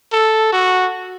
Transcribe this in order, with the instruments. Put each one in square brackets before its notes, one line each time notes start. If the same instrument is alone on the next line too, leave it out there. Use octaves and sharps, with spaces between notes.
[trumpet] A4
F#4